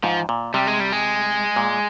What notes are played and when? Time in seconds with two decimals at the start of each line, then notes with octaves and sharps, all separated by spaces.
0.03 G#2 F3
0.29 A#2
0.54 C3 G3
0.67 G#3
0.80 G3
0.92 G#3
1.56 A#2